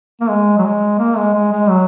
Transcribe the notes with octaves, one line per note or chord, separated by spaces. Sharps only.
A#3
G#3
F#3
G#3
A#3
G#3
G#3
G#3
F#3